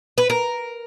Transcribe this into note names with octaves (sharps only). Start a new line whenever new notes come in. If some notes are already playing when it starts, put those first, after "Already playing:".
B4
A#4